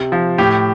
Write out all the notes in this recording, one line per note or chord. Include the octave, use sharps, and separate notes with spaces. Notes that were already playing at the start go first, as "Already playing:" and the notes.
Already playing: C3
F3
A2 G4